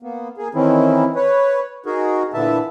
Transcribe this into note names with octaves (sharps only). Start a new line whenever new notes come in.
A#3 B3
A#3 G#4
D#3 E3 C4 C#4 E4
B4 C#5
D#4 F#4 G#4 A#4
A#2 D3 E3 B3 E5 A5